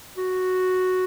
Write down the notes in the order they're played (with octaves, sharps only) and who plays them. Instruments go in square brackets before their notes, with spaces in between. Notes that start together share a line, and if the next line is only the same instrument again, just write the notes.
[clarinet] F#4